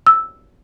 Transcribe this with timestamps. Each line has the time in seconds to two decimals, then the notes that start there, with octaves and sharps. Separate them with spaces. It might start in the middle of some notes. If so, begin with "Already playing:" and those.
0.07 E6